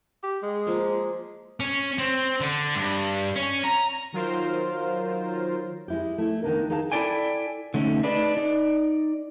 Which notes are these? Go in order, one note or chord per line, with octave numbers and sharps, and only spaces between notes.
G4
G#3
F3 A#3
C#4
C4
D3
G2
C#4
A#5
D#3 F#3 F4 A#4 C5
G#3 E4 G4
A3 E4
D#3 F3 A#3 B3 D4 D#4
D#4 G#4 B4 F5 G5 A5
E4 G4 A4 D5 G5 G#5
D3 A3 C#4 D#4
D4 D#4 G#4 B4 D5
D#4 D5